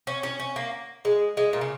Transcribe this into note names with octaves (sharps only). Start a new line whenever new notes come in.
C#4
C#4
C#4
A#3
G#3
G#3
A#2
C#3